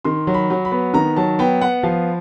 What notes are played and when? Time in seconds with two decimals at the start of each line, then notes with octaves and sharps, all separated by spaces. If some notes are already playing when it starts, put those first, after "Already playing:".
0.05 D#3 C6
0.27 F#3
0.34 B5
0.50 F#3
0.65 B5
0.71 B3
0.94 D#3 A#5
1.16 F#3 A5
1.39 B3 G5
1.61 B3 F#5
1.83 F3 F5